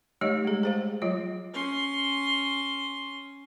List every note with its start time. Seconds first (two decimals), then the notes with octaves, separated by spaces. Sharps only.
0.21 G3 A3 D#4 G4 C#5 D#5
0.45 G#3 G#4
0.63 G#4 C5 F5
1.02 F#3 F4 C#5
1.54 C#4 C6